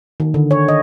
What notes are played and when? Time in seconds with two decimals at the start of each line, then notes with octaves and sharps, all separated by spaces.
0.20 D#3
0.34 D3
0.51 C#5
0.69 D#5